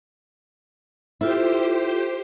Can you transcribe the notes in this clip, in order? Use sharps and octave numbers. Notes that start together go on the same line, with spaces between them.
E4 F4 G4 A4 C5